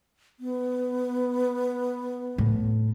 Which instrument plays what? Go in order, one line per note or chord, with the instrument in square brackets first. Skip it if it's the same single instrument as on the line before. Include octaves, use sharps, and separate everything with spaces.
[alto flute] B3
[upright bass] A2